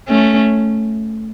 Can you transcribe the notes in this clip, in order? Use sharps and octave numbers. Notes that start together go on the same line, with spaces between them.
A3 C#4